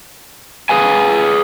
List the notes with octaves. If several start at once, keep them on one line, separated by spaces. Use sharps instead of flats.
G#4 B4 F5 G#5